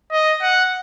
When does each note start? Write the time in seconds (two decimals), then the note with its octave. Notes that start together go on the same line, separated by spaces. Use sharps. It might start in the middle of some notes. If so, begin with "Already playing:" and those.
0.12 D#5
0.42 F#5